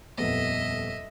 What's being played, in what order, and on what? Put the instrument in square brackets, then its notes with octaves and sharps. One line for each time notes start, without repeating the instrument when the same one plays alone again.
[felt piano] D#1 F2 B3 [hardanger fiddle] D#5 E5